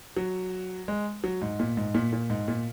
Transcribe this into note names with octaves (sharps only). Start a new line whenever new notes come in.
F#3
G#3
F#3
G#2
A#2
G#2
A#2
A#2
G#2
A#2